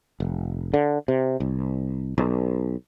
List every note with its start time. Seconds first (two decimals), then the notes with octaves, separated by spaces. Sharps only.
0.20 F1
0.74 D3
1.08 C3
1.40 C2
2.18 B1